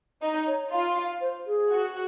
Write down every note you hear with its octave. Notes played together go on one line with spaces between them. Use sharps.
D#4 D#5
C#5
F4 F5
C5
G#4
F#4